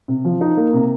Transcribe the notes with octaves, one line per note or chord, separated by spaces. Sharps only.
C3
F3
D#4
A#3
C3